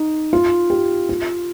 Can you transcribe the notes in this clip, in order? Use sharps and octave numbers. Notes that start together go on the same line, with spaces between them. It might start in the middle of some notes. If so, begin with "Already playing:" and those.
Already playing: D#4
F4
G4
F4